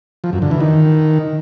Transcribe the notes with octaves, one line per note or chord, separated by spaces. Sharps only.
F3
F#2
D3
E3
D#3